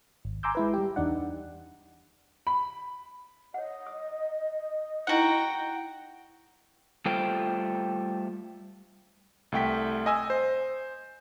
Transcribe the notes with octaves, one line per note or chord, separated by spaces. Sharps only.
G#1
G#5 A#5 C6 D6 E6 G6
G#3 E4 B4
G3 G4
E2 D4 D#4 D5 F#5
B5
C#5 D#5 F#5
D#6
D#4 E4 F#4 B4 F#5 G5 A#5
G3 A3 F4 C5 G5
C2 A3 G5 B6
D#5 G#5 E6
C5